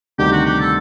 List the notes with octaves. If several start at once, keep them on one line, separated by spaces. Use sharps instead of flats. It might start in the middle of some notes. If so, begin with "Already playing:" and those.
D2 C3 D#3 G3 G4
F#4
G4
A4